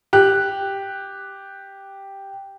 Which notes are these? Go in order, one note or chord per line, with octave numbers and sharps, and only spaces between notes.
G4 F#6